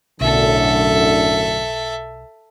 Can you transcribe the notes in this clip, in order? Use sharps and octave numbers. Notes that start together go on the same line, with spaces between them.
B1 F#2 A2 D3 A4 E5